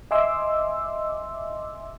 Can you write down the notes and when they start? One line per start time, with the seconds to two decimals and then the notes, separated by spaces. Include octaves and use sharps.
0.11 D#5 E5 G#5 C6 D6 E6